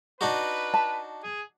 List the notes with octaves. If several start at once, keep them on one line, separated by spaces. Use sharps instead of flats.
D4 D#4 F#4 B4
A5
G#4